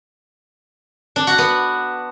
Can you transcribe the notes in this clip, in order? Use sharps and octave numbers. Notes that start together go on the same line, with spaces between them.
D4
F#4
B3